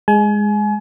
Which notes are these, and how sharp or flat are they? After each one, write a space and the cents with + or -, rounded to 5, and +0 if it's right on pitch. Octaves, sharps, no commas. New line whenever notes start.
G#3 -5 G#5 +35